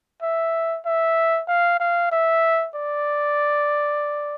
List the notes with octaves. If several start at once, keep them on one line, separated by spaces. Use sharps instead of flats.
E5
E5
F5
F5
E5
D5